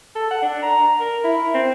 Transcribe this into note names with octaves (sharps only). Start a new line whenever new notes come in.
A4
F#5
D4
A#5
A#4
E4
C4